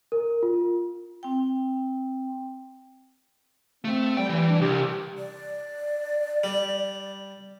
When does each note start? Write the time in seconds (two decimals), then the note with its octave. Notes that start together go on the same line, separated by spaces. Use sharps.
0.12 A#4
0.43 F4
1.23 C4 G5
3.85 A3 C4
4.17 G3 G5
4.29 E3
4.49 D4
4.61 C2 G4
5.18 D5
6.44 G3